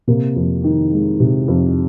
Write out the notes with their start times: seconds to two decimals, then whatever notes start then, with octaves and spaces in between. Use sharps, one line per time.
0.07 C3 A#3
0.36 F2
0.64 D#3
0.92 G#3
1.20 C3
1.48 F2